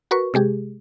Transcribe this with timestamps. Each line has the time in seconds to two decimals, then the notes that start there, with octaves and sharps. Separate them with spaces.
0.11 F#4 A#4 B4 C#6
0.34 C3 G#3 G4 G#4